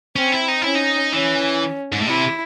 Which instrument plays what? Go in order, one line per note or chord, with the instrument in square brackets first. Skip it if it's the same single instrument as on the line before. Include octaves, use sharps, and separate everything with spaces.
[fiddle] C4 [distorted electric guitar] C#4
[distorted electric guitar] E4
D#4
[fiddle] C#4 [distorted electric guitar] E4
[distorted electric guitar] D#4
[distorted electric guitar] E3 [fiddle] C#4
[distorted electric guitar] G#2
A2
[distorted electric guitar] C3 [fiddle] E4